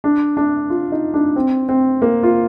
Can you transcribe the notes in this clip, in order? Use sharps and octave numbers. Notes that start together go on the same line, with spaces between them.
D4
D4
F4
D#4
D4
C4
C4
A#3
F4